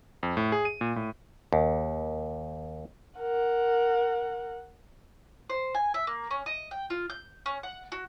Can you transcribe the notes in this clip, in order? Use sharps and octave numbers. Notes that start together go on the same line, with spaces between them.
F2
A2
G#4
D#7
A#2
A2
D#2
A#4 F#5
C5
G#5
E5
A#3
C#4
D#5
G5
F4
G6
C#4
F#5
F#4